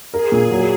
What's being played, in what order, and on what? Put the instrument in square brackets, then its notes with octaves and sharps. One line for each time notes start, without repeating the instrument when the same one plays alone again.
[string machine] G#4 [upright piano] A#4
[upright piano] A#2
F#3